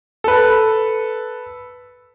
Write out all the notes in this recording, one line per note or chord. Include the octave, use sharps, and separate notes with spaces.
A4 B4